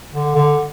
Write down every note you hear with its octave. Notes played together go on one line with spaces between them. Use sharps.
D3
D3